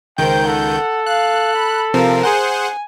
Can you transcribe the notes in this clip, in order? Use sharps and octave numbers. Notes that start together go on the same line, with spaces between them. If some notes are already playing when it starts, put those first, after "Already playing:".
C#2 D#3 A#4 C5 G5 G6
A4 F#5
F5 F#6
B5
C3 F3 C4 A#4 F5
G#4 C5 F#5 G#5